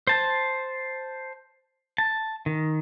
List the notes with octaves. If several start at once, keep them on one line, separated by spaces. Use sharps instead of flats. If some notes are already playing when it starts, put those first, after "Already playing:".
C5 A5
A5
D#3